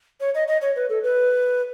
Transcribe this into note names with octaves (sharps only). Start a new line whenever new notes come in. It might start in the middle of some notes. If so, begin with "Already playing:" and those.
C#5
D#5
D#5
C#5
B4
A4
B4